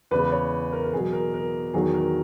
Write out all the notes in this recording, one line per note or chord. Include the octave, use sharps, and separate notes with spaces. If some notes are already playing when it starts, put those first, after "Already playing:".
E2 C#3 G#3 B4
C#5
A#4
A#4
E2 B2 F#3 G#4
A#4
A#4
E2 D#3 F#3 G#4
A#4